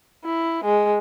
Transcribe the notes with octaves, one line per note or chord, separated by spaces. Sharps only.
E4
G#3